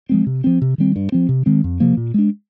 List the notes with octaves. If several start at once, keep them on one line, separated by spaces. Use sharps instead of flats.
F3 G#3 C4
C3
F3 C4
C3
D#3 G3 C4
G2
F3 C4
C3
D#3 G#3 C4
F2
C3 F3 A#3
A#2
G#3 D4